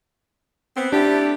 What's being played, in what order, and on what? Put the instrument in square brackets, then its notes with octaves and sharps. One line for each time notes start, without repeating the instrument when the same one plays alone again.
[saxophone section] B3 C4
[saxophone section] A3 E4 G4 [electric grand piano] D4